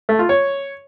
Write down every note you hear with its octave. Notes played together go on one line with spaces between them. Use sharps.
A3
F4
C#5